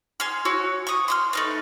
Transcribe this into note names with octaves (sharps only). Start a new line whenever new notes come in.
G#4 C6 F6
F#4 C#5 E6
C#6 D#6
C6 D6 F6
A3 D#4 B4